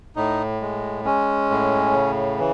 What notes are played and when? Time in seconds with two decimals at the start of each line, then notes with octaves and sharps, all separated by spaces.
0.16 A2 D#4
0.61 G#3
1.05 G#3 C#4
1.50 A2
1.94 C#3
2.38 E3